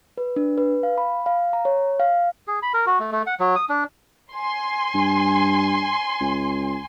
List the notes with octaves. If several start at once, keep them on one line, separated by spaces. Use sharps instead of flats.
B4
D4
B4
F5
B5
F5
A#5
C#5
F5
G#4
B5
A#4
F#4
A3
A3
F#5
F#3
D#6
D4
G#5 C6
G2
C#2